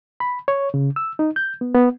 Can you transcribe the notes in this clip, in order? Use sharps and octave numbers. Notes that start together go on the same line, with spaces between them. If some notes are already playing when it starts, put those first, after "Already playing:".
B5
C#5
C#3
E6
D#4
G6
B3
B3